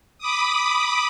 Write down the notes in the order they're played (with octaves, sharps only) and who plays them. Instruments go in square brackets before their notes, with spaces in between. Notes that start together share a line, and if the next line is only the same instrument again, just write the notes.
[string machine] B5 D6 D#6